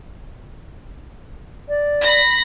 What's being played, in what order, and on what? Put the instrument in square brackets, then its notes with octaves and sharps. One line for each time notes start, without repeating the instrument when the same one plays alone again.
[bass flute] D5
[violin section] B5 A#6